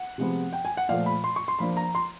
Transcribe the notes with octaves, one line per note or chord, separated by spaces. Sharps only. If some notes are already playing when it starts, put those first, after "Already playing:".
Already playing: F#5
C3 F3 G#3 B3
G5
G#5
F#5
A#2 F3 A3 F5
B5
C6
C#6
C6
F3 A#3 D4 B5
A#5
C6